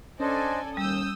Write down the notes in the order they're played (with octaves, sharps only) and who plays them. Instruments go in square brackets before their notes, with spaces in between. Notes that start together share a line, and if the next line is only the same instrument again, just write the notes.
[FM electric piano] C#4 [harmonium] D4 C5 D#5 [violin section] A4 D5 G#5
[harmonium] D#2 [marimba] G3 [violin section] D#6 E6 G6